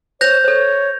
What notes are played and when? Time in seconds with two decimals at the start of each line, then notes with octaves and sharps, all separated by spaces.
0.21 C5 C#5 G6 A#6 F7
0.44 A4 C5 C#5